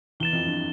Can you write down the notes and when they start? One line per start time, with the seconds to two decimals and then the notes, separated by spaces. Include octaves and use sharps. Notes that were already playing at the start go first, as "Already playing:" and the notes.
0.20 E2 E3 A6 E7 G7
0.32 F2 F3
0.46 G2